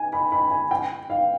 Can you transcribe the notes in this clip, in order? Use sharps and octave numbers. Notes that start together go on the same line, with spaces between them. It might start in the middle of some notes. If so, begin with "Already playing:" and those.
Already playing: G#5
B5
B5
G#5
G5
F5